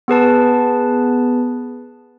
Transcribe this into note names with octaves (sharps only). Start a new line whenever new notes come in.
B3 G#4 B4 A5